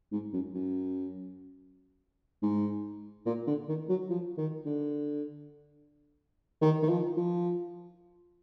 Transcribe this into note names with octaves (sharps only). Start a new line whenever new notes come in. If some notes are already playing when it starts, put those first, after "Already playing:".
G#2
F#2
F#2
G#2
A#2
D3
D#3
F#3
F3
D#3
D3
D#3
D#3
F3
F3